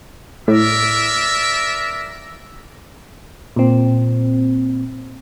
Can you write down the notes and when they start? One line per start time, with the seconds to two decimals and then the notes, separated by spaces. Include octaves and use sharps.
0.48 A2 A#4 D5 E5
3.56 A#2 C4